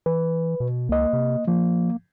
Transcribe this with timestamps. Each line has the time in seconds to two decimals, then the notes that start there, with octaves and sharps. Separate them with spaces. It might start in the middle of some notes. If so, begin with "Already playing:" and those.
0.06 E3 B4
0.60 B2
0.89 C#2 A#3 D#5
1.13 C3
1.48 F3 A#3